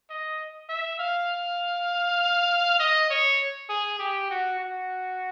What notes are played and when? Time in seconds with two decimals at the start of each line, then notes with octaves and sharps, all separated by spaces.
0.10 D#5
0.69 E5
1.00 F5
2.79 D#5
3.10 C#5
3.69 G#4
3.99 G4
4.30 F#4
4.60 F#4